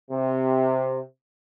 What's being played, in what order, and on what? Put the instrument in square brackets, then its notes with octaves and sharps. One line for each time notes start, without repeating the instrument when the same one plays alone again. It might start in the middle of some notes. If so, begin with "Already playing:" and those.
[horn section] C3